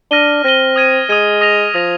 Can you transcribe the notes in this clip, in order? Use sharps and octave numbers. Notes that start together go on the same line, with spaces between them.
D4 F6 A#6 D#7 G7
C4 F6 A#6 D#7 G7
D#6 G#6 D#7
G#3 D#6 G#6 D#7
D#6 A#6 F7
F3 D#6 A#6 F7